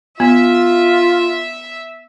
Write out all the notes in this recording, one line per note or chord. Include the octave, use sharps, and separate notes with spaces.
B3 F4 E5